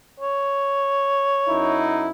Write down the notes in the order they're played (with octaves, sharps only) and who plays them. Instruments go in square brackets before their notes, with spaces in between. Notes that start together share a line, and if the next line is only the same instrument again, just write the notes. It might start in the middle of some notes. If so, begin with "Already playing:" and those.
[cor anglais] C#5
[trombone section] F#2 D#4 E4